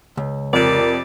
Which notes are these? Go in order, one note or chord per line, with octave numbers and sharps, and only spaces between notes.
C#2
F2 C3 A#4 D5